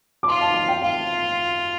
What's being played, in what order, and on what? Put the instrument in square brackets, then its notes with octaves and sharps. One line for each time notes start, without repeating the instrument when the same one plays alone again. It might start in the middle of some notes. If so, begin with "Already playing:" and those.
[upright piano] D6
[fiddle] F4 [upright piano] C6
[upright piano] A5
A5
G5
[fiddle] F4 [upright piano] F5